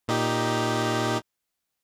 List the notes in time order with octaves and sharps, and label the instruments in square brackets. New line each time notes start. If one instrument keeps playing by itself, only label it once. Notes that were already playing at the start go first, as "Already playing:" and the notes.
[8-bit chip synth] A#2 D#4 G4